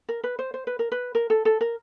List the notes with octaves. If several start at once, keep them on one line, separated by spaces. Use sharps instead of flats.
A#4
B4
C5
C5
B4
A#4
B4
A#4
A4
A4
A#4